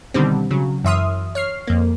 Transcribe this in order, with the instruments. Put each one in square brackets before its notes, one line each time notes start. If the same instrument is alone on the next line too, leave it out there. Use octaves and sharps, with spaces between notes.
[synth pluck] B2 D3 D#3 G3 C4
C#3 F#3
F#2 E3 E5 C6 D#6 F6
C#5 F6 C7
F2 A#3